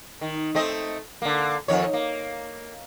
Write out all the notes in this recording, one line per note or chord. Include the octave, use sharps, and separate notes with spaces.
D#3
A3 C4 D#5
D3 A#3
F2 D#3 C#5
A#3